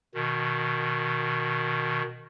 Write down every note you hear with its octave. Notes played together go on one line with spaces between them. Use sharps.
B2 D#3